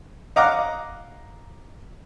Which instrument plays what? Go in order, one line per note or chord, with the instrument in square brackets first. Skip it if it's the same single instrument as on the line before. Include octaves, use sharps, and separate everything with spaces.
[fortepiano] D#5 F5 F#5 A#5 D6